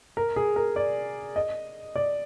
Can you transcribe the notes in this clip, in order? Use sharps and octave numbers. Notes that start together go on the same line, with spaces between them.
A#4
G#4
A#4
D5
D#5
D5